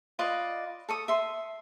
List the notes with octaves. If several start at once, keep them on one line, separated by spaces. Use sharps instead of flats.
F4 B4 D5 D#5
A4 C#6 D#6
E5 C6